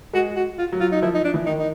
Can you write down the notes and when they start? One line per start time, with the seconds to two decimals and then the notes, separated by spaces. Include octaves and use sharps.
0.14 G#3 F#4
0.36 F#4
0.58 F4
0.72 F#3
0.80 F4
0.92 D#4
1.02 F3 E4
1.14 D#4
1.24 D4
1.34 E3
1.46 D#3 D#4
1.59 D#4